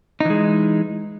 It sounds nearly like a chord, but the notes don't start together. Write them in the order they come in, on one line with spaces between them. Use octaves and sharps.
D#4 E3 G#3